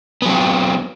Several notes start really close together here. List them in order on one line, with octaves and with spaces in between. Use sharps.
B3 F#3 C4